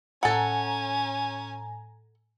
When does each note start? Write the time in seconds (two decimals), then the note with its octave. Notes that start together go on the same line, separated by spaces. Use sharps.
0.23 A2 C#4 A4 F#5 G#5 A#5